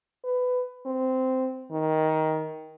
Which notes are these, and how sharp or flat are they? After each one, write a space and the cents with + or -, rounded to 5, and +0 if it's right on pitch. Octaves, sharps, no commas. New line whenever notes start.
B4 +15
C4 -10
D#3 +15